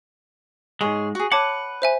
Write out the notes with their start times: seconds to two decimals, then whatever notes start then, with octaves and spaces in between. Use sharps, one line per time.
0.81 G#2 G#3 G#4 C#5
1.15 F#4 G#4
1.32 B4 C#5 F#5 A5 D6
1.82 C5 E5 G#5